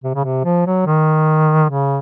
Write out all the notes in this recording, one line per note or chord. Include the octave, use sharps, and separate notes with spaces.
C3
C#3
C3
F3
F#3
D#3
C#3